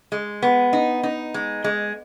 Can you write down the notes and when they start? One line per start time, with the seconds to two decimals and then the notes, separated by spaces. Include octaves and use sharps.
0.12 G#3
0.42 B3
0.73 D#4
1.03 D#4
1.34 G#3
1.64 G#3